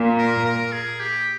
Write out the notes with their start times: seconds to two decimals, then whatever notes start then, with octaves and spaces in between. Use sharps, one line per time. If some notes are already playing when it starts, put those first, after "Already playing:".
Already playing: A#2
0.18 A#4
0.45 A#4
0.72 G#4
1.00 G4